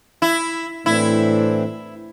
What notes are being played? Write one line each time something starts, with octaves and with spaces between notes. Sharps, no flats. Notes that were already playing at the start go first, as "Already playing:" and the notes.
E4
A2 E3 C4 D4 E4